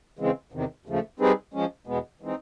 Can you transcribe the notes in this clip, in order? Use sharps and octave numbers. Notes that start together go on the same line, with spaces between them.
C#3 E3 G#3 C4
E2 C3 D#3
D#2 C#3 F3 A3
G3 C4 D#4 G#4 B4
F3 G#3 C#4
E2 B2 G#3 B3
E3 G#3 C4 D#4